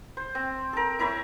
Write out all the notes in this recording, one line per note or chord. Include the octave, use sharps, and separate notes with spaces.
C5
C4
A4 A#4
E4 A#4 C#5 E5